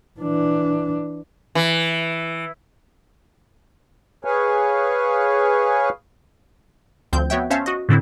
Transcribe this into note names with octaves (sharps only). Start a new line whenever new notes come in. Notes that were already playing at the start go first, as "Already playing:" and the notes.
E3 D4
E3
G#4 B4 C#5 F5 G#5
D2 F3 C4 G6
B3 F#4 C#5 E5 G5
C#4 C5 C#5 E5 F5 A5
F#4 D#5
A2 D3 C4 E4